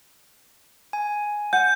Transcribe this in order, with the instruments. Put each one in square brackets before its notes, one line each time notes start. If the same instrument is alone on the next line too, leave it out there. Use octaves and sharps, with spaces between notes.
[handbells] G#5
[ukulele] F#5 [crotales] G6